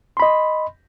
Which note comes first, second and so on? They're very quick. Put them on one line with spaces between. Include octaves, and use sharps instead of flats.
C6 B5 D#5